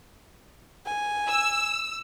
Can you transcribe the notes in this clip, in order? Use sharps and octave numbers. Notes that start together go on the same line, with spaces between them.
G#5
E6